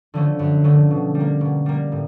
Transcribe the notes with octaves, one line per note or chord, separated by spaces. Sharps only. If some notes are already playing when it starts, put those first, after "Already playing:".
D3 F3 A3 C#4
F#2
D3 F3 A3 C#4
B2
G3
A#3
B2
G3 A#3
A2